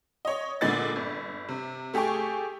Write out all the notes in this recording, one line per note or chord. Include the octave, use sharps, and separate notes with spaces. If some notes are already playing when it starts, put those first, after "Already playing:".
C#5 D#5
A#2 D3 G#3 B3 A6
G1
C3
A3 G4 G#4 G5 C#6